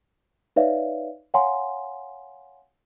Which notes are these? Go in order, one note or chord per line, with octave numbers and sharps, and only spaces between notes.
D#4 B4 C#5 D5 E5 F5
C#5 F5 F#5 G#5 A#5 C6